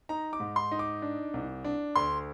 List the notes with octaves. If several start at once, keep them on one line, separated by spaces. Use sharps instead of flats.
D#4 A#5
D6
G#2
C6
D#4
D6
D4
C2
D4
D2 C6